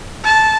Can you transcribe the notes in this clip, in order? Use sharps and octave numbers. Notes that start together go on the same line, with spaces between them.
A5